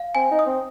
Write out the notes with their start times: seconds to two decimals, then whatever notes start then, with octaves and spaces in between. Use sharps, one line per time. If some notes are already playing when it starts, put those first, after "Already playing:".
Already playing: F5
0.15 C4 G#5
0.31 D#4
0.39 D#6
0.46 C4